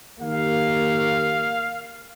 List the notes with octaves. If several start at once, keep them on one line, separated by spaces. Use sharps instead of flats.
D#3 A#3 G4 F5